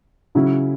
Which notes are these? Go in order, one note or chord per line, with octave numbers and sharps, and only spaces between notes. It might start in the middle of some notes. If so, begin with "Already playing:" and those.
C#3 F#3 C#4 E4